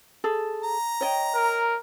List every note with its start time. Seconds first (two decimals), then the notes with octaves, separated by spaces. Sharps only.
0.24 G#4 A4
0.63 A#5
1.01 C#5 D#5 G5
1.35 A#4